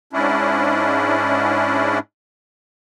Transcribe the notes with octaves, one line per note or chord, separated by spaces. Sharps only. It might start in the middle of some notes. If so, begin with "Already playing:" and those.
G#2 C#4 D4 E4